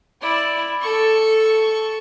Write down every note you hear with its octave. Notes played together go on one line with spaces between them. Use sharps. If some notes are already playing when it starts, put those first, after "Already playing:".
E4 D5
A4 C#6